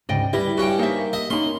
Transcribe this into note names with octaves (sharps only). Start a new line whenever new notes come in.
D2 G#2 C#3 D5 D#5 G5
G3 E4 B4 D#5
G2 C#4 F#4 G5
A#3 D#4 C5 E5
D#5 E5
A#3 C#4 D#4 B5 C6